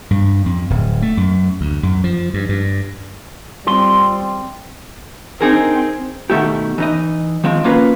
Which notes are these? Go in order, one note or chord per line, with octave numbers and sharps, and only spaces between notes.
G2
F2
D1
A3
F#2
D2
F#2
F3
G2
G2
G3 C4 F4 C6
C4 D#4 G#4 A#4
B2 D#3 A3 E4 G4
E3 D#4 D#5
D#3 F3 G#3 C4
A#3 C#4 F4 A#4 B4